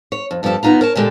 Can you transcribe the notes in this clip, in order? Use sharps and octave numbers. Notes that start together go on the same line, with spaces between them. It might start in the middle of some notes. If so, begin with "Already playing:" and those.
C#5
F2
G2 F3 C4 G4 A4 A5
D#2 B3 D#4 F4 A#5
A#4 C#5 A5
A#2 D3 G#3 G4 A4